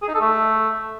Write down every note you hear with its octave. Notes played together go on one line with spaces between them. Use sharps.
G#4
D#4
A4
A3